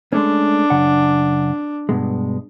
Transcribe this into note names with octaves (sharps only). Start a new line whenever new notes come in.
G#3 A3 C#4 D4
F#2 C#3 F#5
G2 B2 G#3